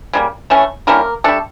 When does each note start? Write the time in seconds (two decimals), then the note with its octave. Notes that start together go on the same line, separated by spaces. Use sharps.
0.13 C#3 G3 A#3
0.50 E3 A3 C#4
0.87 D3 G3 A#3 C#4 E4 A#4
1.24 G3 A3 D4 A4